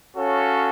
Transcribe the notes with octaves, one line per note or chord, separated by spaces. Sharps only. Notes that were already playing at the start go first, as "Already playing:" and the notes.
C#4 F#4 A4 C#5 F5